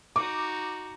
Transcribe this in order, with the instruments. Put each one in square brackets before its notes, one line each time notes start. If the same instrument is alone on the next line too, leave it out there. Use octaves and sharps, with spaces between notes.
[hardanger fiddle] D#4 F#4 [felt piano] D6